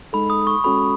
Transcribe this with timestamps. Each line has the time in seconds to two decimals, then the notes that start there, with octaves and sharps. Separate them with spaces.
0.13 G#3 D#4 A4 B5
0.30 D#6
0.47 C#6
0.64 G#3 C#4 F#4 A4 B5